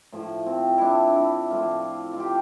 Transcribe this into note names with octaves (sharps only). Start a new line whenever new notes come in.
A2 F3
C4
D4 E4
D4
E4
A2 F3 F4
F4
G4